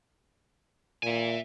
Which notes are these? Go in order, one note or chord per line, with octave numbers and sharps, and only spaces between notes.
A#2 E5 G#5